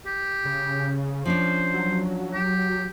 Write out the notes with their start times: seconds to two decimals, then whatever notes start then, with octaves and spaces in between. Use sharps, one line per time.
0.06 G4
0.45 C#3
1.25 F3 C#4 D4 C5
1.74 F#3
2.33 G4